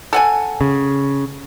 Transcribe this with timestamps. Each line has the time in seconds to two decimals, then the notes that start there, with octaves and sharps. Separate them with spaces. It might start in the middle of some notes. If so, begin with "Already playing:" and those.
0.13 A4 F#5 G#5
0.61 C#3